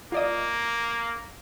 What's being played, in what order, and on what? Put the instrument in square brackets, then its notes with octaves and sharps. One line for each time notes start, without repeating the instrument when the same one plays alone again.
[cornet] A#3 [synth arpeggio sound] F4 D5 D#5